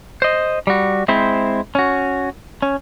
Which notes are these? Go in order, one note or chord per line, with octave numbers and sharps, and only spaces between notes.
C5 D#5
G3 F#4
G#3 C4 E4 C5
C#4 F#4
C#4